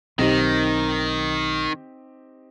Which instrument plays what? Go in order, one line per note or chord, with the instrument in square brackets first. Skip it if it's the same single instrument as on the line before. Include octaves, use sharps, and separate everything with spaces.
[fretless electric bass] B1 [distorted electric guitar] D#3 [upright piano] C4 D#4 G4